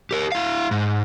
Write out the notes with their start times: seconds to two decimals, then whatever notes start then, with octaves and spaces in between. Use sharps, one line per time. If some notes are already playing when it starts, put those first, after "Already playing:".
0.11 G4 A#4
0.32 E4 F5
0.71 G#2